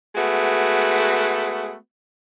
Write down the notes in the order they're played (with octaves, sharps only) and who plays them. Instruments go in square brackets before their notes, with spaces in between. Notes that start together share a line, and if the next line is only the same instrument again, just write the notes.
[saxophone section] G#3 A3 B3 F#4